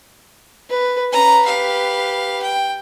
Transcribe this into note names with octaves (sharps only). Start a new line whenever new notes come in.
B4
C#4 B4 A#5
G4 F5
G5